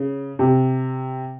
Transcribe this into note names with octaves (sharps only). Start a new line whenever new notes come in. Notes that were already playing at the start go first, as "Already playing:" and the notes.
Already playing: C#3
C3